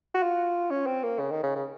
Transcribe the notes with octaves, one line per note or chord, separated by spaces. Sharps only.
F#4
F4
C#4
C4
A#3
C#3
D#3
C#3
C#3